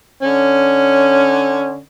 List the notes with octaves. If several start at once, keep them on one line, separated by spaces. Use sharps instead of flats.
D3 C#4